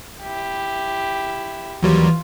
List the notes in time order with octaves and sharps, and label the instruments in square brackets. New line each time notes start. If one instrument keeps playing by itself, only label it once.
[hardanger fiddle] E4 G4
[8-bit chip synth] D#2 F#3 G3 [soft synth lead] E3 [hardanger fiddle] F4